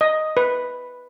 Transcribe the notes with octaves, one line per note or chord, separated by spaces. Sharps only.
D#5
B4